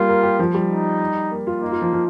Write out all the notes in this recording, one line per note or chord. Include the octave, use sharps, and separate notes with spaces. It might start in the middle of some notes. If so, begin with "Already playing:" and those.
Already playing: G3 A#3 F4
A#4
G4
F3
G3
D#4
A#3
F4
A#3 D#4
F4
F3
F3